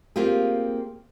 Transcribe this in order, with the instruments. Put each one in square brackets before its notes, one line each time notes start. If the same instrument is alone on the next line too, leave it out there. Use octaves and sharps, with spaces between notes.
[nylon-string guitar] A#3 C4 F4 G4 G#4